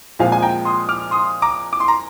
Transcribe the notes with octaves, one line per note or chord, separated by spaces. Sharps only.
A#2 F3 G#3 C4 F5 G#5
G#5
G5 A#5
C6 D#6
D6 F6
C6 D#6
A#5 D6
D6
C6
A#5